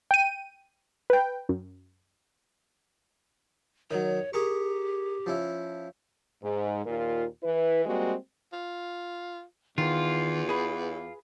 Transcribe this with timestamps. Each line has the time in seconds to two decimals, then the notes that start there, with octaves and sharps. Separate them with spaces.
0.11 G5 D#7
1.10 B4 G5
1.49 F#2
3.91 D#3 F#3 C#5
4.33 G4 G#4 A#4 C#6
5.26 F3 C#4 E4
6.43 G#2
6.85 D#2 A#2 F4 A#4
7.43 E3 E4 B4
7.86 G3 G#3 A#3 C4 F#4
8.53 F4
9.78 E2 D#3 F4
10.49 G#4 B4